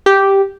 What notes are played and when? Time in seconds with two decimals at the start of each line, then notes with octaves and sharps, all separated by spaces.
0.06 G4